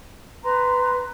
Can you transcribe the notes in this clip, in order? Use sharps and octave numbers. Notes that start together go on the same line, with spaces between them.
B4 A#5 C6